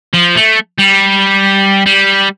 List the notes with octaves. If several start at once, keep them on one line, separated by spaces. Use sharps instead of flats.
F3
A3
G3
G3